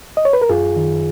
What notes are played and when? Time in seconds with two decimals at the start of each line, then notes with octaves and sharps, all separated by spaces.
0.17 D#5
0.25 C#5
0.33 B4
0.42 A#4
0.49 F#2 F4 G#4
0.76 D#3